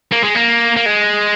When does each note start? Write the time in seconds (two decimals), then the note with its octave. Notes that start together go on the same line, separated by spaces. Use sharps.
0.12 A#3
0.23 G#3
0.35 A#3
0.76 A#3
0.86 G#3